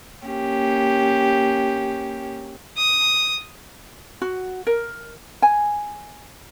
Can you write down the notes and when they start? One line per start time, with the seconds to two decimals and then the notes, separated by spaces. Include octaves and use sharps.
0.24 A#3 C#4 G4
2.78 D#6
4.22 F#4
4.67 A#4
5.42 G#5